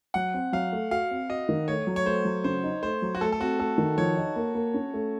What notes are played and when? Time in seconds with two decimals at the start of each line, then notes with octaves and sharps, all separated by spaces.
0.14 F#3 F#5
0.34 C4
0.53 F#3 F5
0.73 A3
0.91 F#4 F5
1.11 C4
1.30 F#4 D#5
1.49 D#3
1.68 A3 C#5
1.87 F#3
1.96 C#5
2.06 A3 C5
2.25 F#3
2.44 C#3 C5
2.64 D#4
2.83 A3 C5
3.02 F#3
3.15 F#4
3.21 A3 A4
3.32 A4
3.40 C4 F#4
3.59 A3 A4
3.78 D#3
3.97 F3 C#5
4.17 D#4
4.36 A#3
4.55 A#3
4.74 C#4
4.94 A3